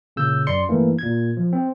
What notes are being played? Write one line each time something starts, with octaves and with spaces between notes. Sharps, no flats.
A#2 C#3 E6 G6
F#2 D5 C6 C#7
G2 E3 A3 A#3
A#2 G#6
F3
C4